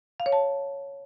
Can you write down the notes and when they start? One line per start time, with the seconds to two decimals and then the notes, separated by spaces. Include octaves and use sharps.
0.20 F5
0.26 C#5
0.32 A5